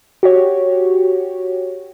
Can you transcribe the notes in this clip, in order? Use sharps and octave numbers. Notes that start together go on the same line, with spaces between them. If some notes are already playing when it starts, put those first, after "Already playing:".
F#4 G4 C#5